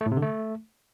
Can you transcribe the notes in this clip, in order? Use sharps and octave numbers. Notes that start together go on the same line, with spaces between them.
A3
A2
C3
D3
A3